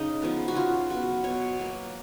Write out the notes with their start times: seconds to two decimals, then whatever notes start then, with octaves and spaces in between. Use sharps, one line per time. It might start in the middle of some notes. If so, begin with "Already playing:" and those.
Already playing: C#3 D#4
0.22 F3 G#3 B3
0.48 F#4
0.55 C#3 F4
0.90 F#3 B3 F#4
1.24 B2 C#5
1.59 F#3 A#3